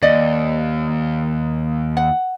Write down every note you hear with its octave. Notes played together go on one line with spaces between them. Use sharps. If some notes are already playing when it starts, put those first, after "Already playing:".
D#2 D5 D#5
F#5